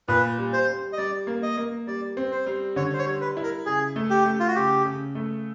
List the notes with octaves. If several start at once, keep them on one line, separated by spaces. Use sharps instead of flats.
A#2 B4
G3
C5
G3
D#5
G3 D5
A#3
D#5
A#3
G3 D5
C4
C5
G3
D3 C#5
C5
C#5
G3
B4
E4
A#4
C#3 G#4
A3
G4
A3
F4
F#4
C#3 G4
C#3
A3